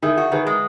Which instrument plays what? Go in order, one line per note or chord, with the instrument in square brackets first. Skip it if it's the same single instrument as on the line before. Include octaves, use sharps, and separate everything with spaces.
[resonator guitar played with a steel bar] D#3 [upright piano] E4 G#4
[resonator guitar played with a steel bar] F#4
[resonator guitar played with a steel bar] D#3 [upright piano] G#4 B4
[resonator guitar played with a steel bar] G#3